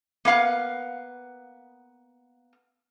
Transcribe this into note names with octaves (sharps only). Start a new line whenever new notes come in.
A#3 B3 F5 F#5